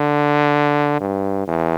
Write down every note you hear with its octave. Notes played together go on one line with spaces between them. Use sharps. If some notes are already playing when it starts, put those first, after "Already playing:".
Already playing: D3
G2
E2